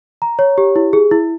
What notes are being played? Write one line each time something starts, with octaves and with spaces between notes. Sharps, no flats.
A#5
C#5
G4
E4
G#4
E4